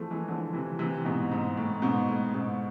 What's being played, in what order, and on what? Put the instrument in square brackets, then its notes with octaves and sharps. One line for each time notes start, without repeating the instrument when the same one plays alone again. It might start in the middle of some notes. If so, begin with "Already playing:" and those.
Already playing: [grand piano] E3 F3 G#3 A3
E3 G#3
D3 F3
C3 E3
C3 E3
G#2 B2
G#2
A2
G#2 B2
A2
G#2 B2